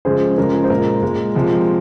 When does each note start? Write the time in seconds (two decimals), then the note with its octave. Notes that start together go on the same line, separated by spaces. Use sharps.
0.05 C#3 F3 G#3 G#4 C5
0.38 C#3 F3 G#3 A#4
0.54 G#4
0.64 C5
0.70 A#2 G#3 A#4
1.03 A#2 G#3
1.35 C3 F3 G#3